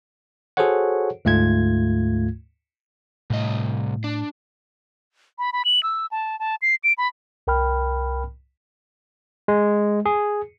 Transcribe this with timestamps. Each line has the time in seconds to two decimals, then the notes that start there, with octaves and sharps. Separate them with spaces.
0.57 F#4 G#4 A4 C5 C#5 F#5
1.25 D2 G#2 A3 F4 G#6
3.30 C2 A2 D#5
4.04 D4
5.39 B5
5.53 B5
5.65 F#7
5.83 E6
6.11 A5
6.40 A5
6.62 C7
6.84 D7
6.98 B5
7.47 C2 A#4 G5 B5 F6
9.48 G#3
10.06 G#4